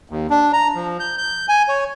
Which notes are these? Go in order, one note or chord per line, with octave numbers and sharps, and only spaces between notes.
D#2
D4
A#5
F3
G6
G6
G#5
C#5